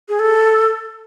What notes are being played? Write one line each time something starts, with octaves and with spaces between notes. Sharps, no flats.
G#4
A4